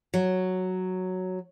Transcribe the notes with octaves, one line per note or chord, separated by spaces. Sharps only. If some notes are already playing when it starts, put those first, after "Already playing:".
F#3